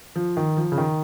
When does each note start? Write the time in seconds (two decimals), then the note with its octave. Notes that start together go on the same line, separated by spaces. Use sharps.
0.16 F3
0.37 D#3
0.57 F3
0.72 C#3
0.78 D#3